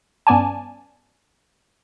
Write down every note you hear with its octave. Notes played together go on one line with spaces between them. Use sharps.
G2 B3 C#4 D5 G#5 A5